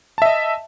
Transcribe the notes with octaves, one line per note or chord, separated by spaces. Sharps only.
D#5 E5 A5